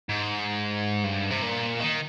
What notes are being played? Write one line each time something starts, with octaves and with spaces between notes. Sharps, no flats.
G#2
G2
C3
A#2
D#3